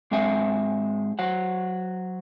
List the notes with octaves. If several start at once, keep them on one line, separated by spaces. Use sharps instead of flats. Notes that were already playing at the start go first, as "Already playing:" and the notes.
G#2 G#3 C4 E5 G#5
F#3 C5 F#5